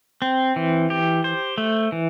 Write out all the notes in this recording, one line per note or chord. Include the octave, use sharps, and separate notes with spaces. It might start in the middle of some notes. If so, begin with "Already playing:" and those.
C4
E3
G4
C5
A3
E3